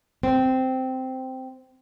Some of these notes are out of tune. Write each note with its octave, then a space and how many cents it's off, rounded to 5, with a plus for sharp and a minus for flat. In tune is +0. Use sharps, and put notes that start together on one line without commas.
C4 -10